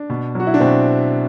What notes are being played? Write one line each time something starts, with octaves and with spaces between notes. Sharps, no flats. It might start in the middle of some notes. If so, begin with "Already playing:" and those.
Already playing: D4
B2
F#3 F#4
E4
D4
B2 C4